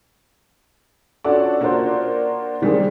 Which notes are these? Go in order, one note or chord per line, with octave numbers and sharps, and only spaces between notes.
C#4 D4 F4 F#4 A4 D5
A#3 D4 F4 F#4 A#4 C5
D#3 G3 A#3 C4 D4 G#4